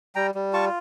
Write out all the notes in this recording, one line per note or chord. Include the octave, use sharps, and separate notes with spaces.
G3 G5 A#5
G3
F4 A5 C#6